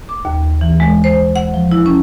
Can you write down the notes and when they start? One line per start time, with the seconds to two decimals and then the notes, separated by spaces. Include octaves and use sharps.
0.09 D6
0.25 D#2
0.61 E3
0.80 G#3
1.04 C5
1.36 F#5
1.54 F3
1.72 E4
1.86 C#4